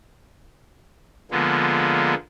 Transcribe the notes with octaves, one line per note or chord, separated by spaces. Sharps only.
D3 F3 G#3 A#3 B3